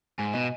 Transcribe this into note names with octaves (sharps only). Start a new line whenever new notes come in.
G#2 G#5
B2 D#5